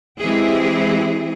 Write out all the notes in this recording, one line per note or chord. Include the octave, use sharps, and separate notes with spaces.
E3 G#3 C4 E4 G4 G#4